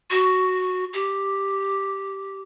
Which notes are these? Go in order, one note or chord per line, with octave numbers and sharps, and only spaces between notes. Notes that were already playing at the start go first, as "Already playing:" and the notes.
F#4
G4